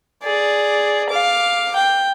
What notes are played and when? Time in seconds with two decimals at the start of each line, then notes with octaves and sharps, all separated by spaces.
0.23 G#4 D5
1.10 F5 D6
1.76 G5